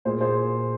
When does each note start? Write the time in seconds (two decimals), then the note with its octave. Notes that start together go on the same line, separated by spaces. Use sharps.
0.05 A#2 G#4 C5
0.21 G#4 C5